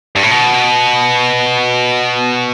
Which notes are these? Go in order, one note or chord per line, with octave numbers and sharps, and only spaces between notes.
G2
A2
B2